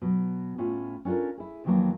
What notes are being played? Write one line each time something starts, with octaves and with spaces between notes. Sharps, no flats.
B2 F#3
A2 C#4 F4
C#4 D4 F4 A4 A#4
E4 G#4
F2 D#3 E3 F#3 A#3 A5